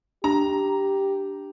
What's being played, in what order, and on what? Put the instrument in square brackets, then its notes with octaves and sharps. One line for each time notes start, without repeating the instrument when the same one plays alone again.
[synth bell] D4 [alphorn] G4 [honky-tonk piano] A#5